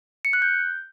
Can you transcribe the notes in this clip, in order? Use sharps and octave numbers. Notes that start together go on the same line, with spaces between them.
C#7
F#6
G6